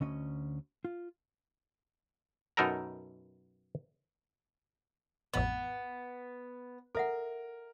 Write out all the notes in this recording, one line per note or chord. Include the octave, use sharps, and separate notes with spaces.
D2 C#4 D#5
F4
F#2 B2 D#4 A4 A#4 A#5
A1 F2 B3 B5
A4 A#4 E5 F#5